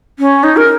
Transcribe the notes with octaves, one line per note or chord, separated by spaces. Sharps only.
C#4
D#4
A#4